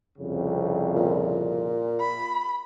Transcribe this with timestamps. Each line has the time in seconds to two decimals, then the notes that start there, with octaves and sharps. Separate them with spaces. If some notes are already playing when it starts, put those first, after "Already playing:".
0.19 C2 F2 C#3
0.96 A#2
2.00 B5